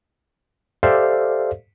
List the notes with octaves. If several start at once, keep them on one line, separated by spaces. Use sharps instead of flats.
G4 A4 C5 D5 E5 F5